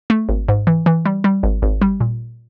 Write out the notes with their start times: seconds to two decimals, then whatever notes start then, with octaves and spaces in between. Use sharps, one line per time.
0.10 A3
0.29 G#1
0.48 G#2
0.67 E3
0.86 E3
1.05 G3
1.24 G3
1.43 G#1
1.62 G#1
1.81 G3
2.00 A#2